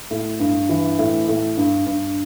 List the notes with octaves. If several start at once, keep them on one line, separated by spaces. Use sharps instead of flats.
A2
G2
E3
A2
A2
G2
G2